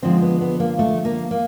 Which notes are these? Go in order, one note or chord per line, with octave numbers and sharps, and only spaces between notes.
D3 F3 G#3 C4
B3
B3
A#3
A3
A#3
A#3